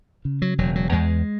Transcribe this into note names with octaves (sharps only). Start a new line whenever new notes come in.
C#3
F#3
E1 F#3
F#3
E2 G#3